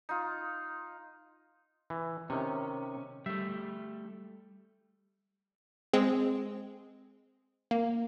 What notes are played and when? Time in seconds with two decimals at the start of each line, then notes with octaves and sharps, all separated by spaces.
0.09 D#4 F4
1.90 E3
2.30 C3 D#3 C#4
3.26 G3 A3 E5
5.93 G#3 C4 G#4
7.71 A#3